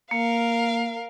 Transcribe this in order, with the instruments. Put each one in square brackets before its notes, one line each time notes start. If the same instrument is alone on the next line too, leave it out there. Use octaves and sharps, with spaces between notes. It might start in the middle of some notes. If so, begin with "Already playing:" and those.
[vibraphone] A#3 [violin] A#4 F5